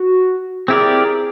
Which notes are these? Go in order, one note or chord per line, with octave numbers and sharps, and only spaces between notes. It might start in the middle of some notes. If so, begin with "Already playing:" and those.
Already playing: F#4
C4 E4 G4 G#4 A#4 D5